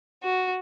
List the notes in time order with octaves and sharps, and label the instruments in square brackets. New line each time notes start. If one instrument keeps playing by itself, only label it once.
[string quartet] F#4